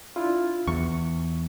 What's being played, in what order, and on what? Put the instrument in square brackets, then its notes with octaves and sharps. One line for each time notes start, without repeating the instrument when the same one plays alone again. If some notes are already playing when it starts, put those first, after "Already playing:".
[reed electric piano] D4 E4 F4
[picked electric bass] E2 [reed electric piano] C#6